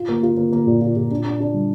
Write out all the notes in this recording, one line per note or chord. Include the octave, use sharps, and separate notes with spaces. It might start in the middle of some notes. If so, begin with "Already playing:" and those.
Already playing: F4
A#3
F4
A#3
A#3
A#2
F4
A#2
D4
D4
D4
G3